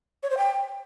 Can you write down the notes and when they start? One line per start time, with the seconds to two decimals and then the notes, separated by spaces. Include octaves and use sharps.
0.23 C#5
0.30 C5
0.37 G5